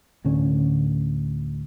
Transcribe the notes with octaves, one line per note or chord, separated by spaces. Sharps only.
D2 A2 D3 C#4